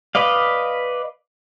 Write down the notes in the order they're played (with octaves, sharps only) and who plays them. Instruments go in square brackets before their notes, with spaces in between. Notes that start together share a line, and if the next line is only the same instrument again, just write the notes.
[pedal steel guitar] B4 D5 D#5 F5